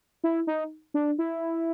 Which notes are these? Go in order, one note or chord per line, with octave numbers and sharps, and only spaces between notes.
E4
D#4
D4
E4